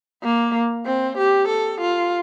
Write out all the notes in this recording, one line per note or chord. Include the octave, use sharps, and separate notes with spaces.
A#3
C4
G4
A4
F4